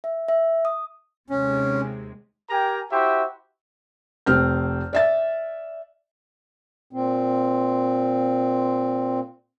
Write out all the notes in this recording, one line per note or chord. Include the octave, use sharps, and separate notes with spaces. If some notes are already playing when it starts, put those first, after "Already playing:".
E5
E5
D#6
D#2 C3 G#3 C#4
G4 A#4 G5 G#5 A#5
E4 F#4 G4 C5 E5
F1 C4 F6 G6
D5 E5 A6
A#2 C4